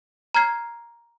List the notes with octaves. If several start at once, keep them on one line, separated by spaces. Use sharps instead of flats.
A#5 F6 G#6 C7